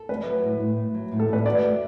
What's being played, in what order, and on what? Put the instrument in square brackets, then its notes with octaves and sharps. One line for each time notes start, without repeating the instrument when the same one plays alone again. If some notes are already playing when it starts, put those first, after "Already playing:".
Already playing: [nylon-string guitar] A4
[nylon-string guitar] A3 [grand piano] B4
[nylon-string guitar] F#3
A2
A2
A3
F#3
A2
[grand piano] A4
[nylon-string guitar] A2 [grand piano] B4
[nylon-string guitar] F#4 [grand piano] D5
[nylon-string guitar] A3